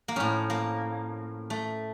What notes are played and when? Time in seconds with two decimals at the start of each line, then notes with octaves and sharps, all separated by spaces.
0.08 A#3
0.16 A2 F3 C#4
0.50 A#3
1.50 A3